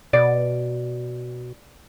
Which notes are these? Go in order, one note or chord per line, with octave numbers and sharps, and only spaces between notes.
B2 D5